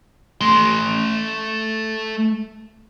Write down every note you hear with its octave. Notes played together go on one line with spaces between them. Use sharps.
A3 C6